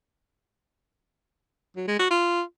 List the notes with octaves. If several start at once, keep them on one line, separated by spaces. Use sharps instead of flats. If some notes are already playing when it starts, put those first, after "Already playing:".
F#3
G#3
F#4
F4